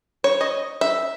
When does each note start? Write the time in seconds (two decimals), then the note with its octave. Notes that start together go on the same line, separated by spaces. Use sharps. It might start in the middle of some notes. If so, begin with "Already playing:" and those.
0.24 C#5
0.41 D#5
0.81 E5